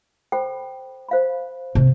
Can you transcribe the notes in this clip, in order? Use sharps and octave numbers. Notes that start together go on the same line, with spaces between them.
A4 C5 G5 B5
C5 F5 B5
C3